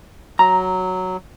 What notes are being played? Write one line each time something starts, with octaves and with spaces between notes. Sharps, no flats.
F#3 A#5